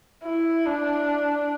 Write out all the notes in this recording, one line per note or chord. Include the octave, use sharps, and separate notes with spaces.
E4
D4